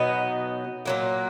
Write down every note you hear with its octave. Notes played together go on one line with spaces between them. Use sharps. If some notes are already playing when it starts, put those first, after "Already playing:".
Already playing: B2 F#3 B3 D#4
A#2 F#3 A#3